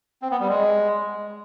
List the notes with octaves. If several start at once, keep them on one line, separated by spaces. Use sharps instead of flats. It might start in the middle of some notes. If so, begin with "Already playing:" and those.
C4
B3
G3
G#3